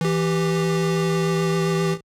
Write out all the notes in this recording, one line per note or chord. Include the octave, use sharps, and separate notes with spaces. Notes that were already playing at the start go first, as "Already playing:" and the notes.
E3 G4